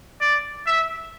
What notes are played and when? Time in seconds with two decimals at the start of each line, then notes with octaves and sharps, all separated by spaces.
0.21 D5
0.66 E5